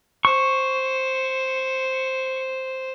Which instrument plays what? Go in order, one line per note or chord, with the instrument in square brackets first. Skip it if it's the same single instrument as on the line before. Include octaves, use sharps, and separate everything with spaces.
[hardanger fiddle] C5 [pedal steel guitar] C#6